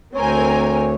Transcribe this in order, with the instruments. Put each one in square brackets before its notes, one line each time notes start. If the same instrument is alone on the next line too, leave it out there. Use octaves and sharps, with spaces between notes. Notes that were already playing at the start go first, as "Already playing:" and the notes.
[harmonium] D2 C#5 [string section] C4 A#4 G#5